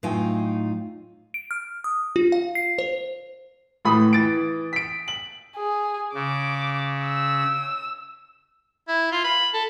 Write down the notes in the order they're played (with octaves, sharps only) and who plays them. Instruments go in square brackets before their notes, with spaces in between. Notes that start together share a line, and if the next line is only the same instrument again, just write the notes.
[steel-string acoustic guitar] A2 F#3 D#4 F4 G5 G#5
[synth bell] D7
F6
D#6
F4
F5
C7
C5
[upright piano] A2 E3 A3 B5 D#6
E3 A6 D7
B6 D7
F#7
[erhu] G#4
[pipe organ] C#3 [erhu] D6
[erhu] E6
[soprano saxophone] E4
F4
B5
A4